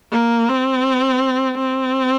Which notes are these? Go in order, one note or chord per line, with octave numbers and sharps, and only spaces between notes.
A#3
C4
C4